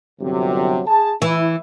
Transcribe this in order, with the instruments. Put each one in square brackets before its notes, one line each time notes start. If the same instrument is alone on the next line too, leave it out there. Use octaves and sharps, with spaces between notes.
[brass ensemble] G1 C3 F#3
G#4 A5
[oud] E3 [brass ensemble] E4